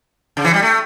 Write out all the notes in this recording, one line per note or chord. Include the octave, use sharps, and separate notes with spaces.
C#3
E3
G3
A3